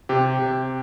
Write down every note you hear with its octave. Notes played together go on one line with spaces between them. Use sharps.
C3 G4
C3